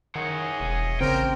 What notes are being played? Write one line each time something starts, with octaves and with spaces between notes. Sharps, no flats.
D#3 E4 G#4 C#5 D#5 F#5
E1
A1 C#3 A#3 C4 A#4 C5 G5